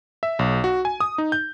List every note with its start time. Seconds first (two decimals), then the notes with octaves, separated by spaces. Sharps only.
0.23 E5
0.39 B1
0.64 F#4
0.85 G#5
1.00 D#6
1.18 D#4
1.32 G6